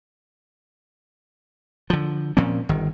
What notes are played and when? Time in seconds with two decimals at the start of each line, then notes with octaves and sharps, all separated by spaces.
1.90 D3 F3
2.37 A#2 F3 C4 C#4
2.69 G1 D#3